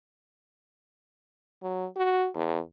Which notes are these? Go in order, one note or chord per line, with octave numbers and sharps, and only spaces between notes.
F#3
F#4
E2